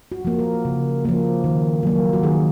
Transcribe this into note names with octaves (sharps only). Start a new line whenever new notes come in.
F#4
F3 A#3
A#4
C#3
F3 A#3
D#3
F#3 A#3
F#4
D#3 G#4